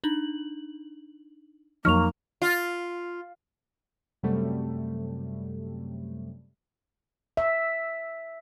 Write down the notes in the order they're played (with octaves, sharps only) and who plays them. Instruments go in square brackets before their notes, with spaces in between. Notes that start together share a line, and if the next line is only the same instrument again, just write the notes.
[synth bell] D4 D#4 F#7
[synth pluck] F2 F#3 D#4 [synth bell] F3 F7 [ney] A#3 [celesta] C#6 F6
[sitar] F4
[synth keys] F#2 C3 F#3 G3 A3
[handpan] E5